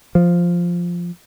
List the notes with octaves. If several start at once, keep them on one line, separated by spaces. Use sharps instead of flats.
F3